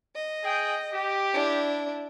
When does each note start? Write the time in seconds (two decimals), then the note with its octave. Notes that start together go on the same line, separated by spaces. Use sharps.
0.15 D#5
0.44 G#4 G5
0.92 G4
1.34 D4 E4